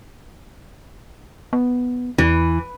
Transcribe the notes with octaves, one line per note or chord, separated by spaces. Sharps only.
B3
E2 E3